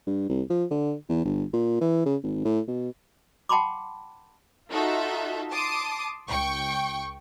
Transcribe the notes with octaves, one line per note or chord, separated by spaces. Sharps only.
G2
C2
F3
D3
E2
G1
A#2
E3
C#3
G#1
A2
B2
F#5 G5 A5 B5 C6 D6
D#4 F4 F#4 A4 E5
A5 C6 D6 D#6
C#2 G5 C#6